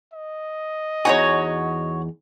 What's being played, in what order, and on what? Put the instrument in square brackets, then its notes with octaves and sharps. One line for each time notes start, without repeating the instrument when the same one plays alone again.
[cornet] D#5
[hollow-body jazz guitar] E2 D#4 G#5 [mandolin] F#4 C#5